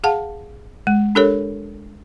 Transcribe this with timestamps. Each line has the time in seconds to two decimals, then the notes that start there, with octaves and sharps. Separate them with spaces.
0.04 G#4 F5 F#5 A5
0.87 G#3
1.15 D4 G4 A4 A#4 C#5